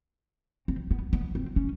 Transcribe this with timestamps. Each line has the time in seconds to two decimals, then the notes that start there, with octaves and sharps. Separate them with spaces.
0.68 C4
0.91 B3
1.13 B3
1.35 C4
1.56 C#4